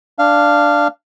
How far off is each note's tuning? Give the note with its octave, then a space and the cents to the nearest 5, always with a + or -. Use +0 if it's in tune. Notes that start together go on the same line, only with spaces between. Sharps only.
D4 +0 F5 -10